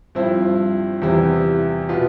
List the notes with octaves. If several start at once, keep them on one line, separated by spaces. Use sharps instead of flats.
G2 F3 C4 E4
E2 C3 G3 C4 E4
B2 B3 F4